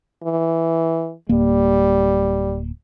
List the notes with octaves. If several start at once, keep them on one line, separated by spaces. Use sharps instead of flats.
E3
D1 G3 A#3